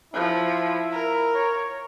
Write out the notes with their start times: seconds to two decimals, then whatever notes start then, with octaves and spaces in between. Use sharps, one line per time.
0.14 F3 E4
0.92 A#4
1.34 C#5